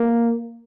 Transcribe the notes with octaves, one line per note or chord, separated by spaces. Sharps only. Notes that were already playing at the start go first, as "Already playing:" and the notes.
Already playing: A#3